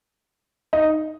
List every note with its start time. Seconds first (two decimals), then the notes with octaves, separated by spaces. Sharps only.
0.73 D#4